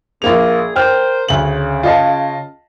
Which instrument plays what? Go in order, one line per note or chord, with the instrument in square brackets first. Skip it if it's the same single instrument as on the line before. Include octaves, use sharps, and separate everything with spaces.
[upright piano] A#1 A#3 F7 [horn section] A#2 G#4
[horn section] A#4 C5 [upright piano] G5 F6
[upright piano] D2 F#7 [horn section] C#3
[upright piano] F4 D#5 A5